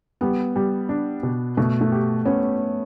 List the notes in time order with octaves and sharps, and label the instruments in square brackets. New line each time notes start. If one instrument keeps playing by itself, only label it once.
[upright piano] G3 [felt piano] B3
[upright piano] G3
D4
B2
[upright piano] B2 [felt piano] A3
[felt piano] A3
[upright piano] G4
[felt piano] B3 [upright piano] C#4